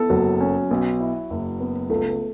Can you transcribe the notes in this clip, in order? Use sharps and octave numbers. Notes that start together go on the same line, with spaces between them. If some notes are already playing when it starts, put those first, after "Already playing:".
Already playing: B3 E4 A4
F#1 F#3
C#4
B1
E4
F#1
B3
C#2 A3